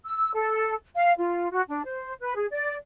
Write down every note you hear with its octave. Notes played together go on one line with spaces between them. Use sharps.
E6
A4
F5
F4
F#4
D4
C5
B4
G#4
D5